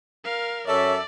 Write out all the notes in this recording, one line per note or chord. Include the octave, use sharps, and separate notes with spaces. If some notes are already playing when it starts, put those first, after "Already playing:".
A#4 F5
F#2 A4 C#5 D5 E5